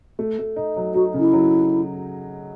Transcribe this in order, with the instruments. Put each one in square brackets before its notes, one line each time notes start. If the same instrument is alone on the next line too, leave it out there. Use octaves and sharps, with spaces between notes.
[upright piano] A3
A3
D#4
F#3
[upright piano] D#4 [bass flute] F#4
[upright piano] C#3
[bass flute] E4
[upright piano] F#3